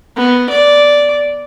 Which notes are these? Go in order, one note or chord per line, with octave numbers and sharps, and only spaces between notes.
B3
D5